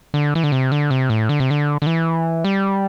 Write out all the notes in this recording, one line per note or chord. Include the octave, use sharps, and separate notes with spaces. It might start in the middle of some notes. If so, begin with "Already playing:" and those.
D3
E3
D3
C3
D3
C3
A2
D3
C3
D3
D3
E3
G3